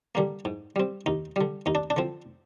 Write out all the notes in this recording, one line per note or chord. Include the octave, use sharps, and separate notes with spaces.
D3 G3 A#3
G#2
G3 C4
D#2 D#4
D3 G3
D#2 D#4
D4
D4
D3 F3 C4